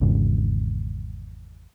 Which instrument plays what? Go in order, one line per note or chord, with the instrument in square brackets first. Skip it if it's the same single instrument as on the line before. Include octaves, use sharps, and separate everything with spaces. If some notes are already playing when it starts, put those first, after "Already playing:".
[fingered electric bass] G#1 E2 G#2 C#3